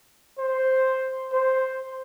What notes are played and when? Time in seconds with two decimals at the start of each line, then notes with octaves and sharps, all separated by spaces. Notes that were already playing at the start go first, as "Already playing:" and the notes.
0.39 C5
1.32 C5